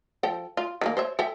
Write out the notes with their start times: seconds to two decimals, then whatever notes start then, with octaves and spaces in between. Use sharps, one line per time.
0.23 F3 A4 G5
0.57 F4
0.81 D#3 G#3 A#3
0.97 C5 C#5 E5
1.19 A4 E5 G5